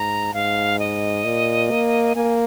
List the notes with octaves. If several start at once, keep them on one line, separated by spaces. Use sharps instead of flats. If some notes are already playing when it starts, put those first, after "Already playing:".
Already playing: G#2 A#5
G#2 F5
D#5
A#2
A#3
A#3 G#5